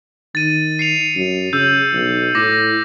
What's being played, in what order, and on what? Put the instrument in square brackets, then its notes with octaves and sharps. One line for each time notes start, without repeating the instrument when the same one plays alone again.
[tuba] D#3 [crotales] A6 D#7
[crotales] C7 C#7 F7
[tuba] F#2
[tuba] C#3 [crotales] E6 G6
[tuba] B1
[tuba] A2 [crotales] D6 A#6